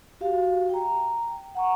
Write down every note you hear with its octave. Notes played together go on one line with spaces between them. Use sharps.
F#4 G4 F5
G5 A#5
F#5 A#5 C#6